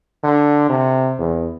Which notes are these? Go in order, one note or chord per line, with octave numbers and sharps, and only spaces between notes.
D3
C3
E2